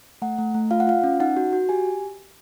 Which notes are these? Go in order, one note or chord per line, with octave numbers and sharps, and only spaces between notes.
A3 F#5
A3
A3
F4 F5
F#5
F4 F5
C#4
D#4 F#5
F#4
F#4
G4 G#5